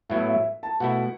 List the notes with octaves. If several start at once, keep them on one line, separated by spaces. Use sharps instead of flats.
A2 F#3 B3 E4 E5
E5
A5
B2 A3 E4 F#5